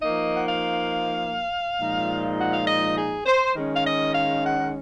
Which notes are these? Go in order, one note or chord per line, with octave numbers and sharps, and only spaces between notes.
F3 A#3 D#4 D#5
F#5
F5
A#2 F3 G#3 D#4
F#5
F5
D#5
G#4
C5
D#3 G#3 C#4
F5
D#5
F5
F#5